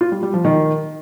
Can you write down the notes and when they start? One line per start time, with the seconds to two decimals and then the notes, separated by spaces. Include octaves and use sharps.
0.01 F4
0.12 G3
0.23 G3
0.34 F3
0.45 D#3